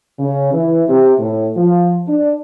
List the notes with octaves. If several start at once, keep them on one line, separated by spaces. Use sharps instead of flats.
C#3
E3
C3
A2
F3
D4